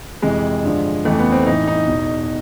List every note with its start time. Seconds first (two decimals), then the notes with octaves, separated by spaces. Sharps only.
0.22 F2 C3 E3 G#3
0.64 G2 D3 F3
1.05 F2 C#3 E3 A3
1.19 B3
1.32 C4
1.46 A2 E3 D#4
1.67 D#4
1.88 E2 B2